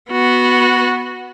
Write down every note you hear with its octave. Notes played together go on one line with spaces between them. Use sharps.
B3 F#4